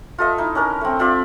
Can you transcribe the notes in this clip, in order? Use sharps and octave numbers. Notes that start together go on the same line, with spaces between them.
F4 A4 D#5 E5
D#4 E4
C#4 D4 A#4
A3 C4
C4 F4 D5 E5